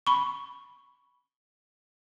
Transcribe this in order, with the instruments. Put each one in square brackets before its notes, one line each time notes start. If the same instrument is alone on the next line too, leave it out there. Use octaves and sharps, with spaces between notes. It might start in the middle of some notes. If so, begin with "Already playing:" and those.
[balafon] B5 C#6